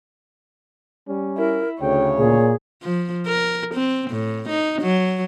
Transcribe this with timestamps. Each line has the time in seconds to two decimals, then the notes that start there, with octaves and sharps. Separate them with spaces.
1.08 G3 C#4
1.38 E4 A#4
1.81 D2 C#3 C#5 G5
2.18 A#2 G#4
2.83 F3
3.26 A#4
3.75 C4
4.10 A2
4.49 D#4
4.82 F#3